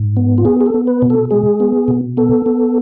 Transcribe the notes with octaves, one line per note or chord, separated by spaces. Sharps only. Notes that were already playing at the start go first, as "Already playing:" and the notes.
Already playing: G#2
B3
F4
B3 G#4
G#4
A4
B3
B4
B2
A4
G#3 G#4
B3
B2
B3 A4
B3